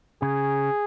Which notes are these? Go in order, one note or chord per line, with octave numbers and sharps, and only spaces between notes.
C#3 G#4